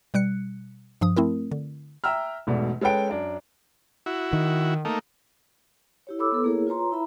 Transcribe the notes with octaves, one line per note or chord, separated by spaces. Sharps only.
B2 G3 F#6 C#7
G2 F3 D#6
A3 C4 E4 A#4
D3
E5 G5 A#5 E6 F6
E1 G#2 B2 A3 D5
G#3 C#4 A4 B4 G5 D7
F#2 D4
E4 F#4
D#3
A3 A#3 D#4
E4 G4 C#5
A4 C#5 B5 D6 E6
B3 A4 B4
A#3 E4 G#4 A#4 C#5
F4 B4 C#5 A#5 C6
E4 E5 A#5 B5